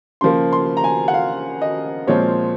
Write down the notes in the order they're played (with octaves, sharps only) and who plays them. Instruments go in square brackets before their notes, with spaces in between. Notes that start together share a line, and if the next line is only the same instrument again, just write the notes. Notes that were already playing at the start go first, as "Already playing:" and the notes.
[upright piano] C#3 F3 A#3 C6
C6
A#5
G#5
F#5
F5
D#5
A#2 F3 G#3 C4 C#5